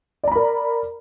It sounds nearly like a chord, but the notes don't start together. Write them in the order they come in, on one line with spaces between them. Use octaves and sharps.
D5 A#5 B5 A#4